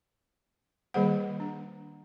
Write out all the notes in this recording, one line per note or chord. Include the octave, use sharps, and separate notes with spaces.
D#3 G3 A#3 G#4 C5 F#5
D4